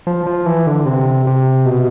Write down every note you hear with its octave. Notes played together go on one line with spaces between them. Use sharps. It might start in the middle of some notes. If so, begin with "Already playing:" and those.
F3
F3
E3
D3
C3
C3
B2